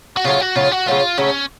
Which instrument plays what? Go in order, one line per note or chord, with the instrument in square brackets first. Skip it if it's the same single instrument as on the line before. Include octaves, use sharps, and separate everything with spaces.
[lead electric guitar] F#4
[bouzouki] C#3 F#3 A3 [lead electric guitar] F4
[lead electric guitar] F#4
[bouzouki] C#3 F#3 A3 [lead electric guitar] F4
[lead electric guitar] F#4
[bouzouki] C#3 F#3 A3 [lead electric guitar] F4
[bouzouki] C#3 F#3 A3 [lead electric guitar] C#4